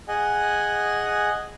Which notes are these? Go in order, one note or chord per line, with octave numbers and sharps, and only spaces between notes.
G#4 D#5 F#5 G#5